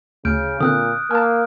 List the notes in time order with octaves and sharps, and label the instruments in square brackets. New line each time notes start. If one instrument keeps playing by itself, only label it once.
[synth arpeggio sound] D2 [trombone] C#3 [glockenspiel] F6 G6 D7
[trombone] A#2 [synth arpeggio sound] D3 C4 [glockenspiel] D#6 F#6
[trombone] A#3 [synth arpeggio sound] G#5 A5 [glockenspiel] F6